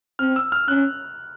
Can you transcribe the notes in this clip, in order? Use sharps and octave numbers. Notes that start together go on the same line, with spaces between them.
C4 F6
E6
F6
C#4 F#6